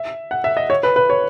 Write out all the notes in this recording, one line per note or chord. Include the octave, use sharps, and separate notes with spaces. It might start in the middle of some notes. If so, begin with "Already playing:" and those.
Already playing: E5
F#5
E5
D#5
C#5
B4
B4
C#5